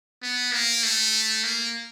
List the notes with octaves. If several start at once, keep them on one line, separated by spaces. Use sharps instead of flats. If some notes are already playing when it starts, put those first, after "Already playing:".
B3
A#3
A3
A#3